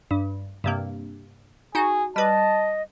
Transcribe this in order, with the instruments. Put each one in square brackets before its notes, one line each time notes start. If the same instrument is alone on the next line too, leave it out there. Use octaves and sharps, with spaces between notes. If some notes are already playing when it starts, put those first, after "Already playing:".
[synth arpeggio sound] G2
G2 C3 A#3
[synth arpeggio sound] D#4 F#4 [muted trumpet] G#4
[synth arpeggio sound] G3 B4 [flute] D#5 [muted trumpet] A5